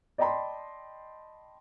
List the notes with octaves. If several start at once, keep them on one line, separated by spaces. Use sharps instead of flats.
D5 D#5 G5 A5 B5 C6